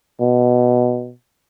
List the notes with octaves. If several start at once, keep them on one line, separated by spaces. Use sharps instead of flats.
B2